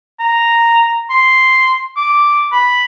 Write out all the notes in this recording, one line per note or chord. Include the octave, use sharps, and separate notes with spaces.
A#5
C6
D6
B5